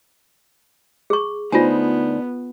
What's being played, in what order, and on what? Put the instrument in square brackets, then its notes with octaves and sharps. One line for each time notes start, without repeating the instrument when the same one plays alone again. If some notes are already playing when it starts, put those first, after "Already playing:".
[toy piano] G#4 C#6
[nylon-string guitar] D2 D#4 C5 [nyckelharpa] B3 [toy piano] F4 G#5